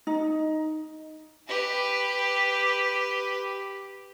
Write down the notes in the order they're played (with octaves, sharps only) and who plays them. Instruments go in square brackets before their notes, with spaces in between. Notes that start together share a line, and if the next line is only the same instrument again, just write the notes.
[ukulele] D#4
[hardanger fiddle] G4 B4